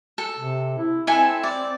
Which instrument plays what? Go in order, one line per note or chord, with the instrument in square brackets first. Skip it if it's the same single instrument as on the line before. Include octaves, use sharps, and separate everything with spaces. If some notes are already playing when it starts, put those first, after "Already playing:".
[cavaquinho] A4
[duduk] C3
E4
[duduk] C4 [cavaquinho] E4 A4 G#5
[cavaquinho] D5